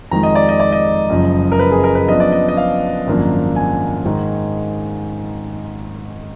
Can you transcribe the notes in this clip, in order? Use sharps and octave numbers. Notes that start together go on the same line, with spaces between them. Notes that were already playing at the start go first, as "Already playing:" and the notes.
F2 D#3 G#3 A#5
D#5
D5
D#5
D5
D#5
F#1 F#2 F3
A#4
B4
G#4
A#4
B4
F#2 F3 B3 D4 D#5
D5
D#5
D#5
F5
G#1 F#2 F3 A#3 D4
G#5
G#2 D#3 G#3